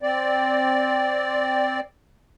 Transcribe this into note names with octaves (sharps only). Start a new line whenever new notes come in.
C4 D5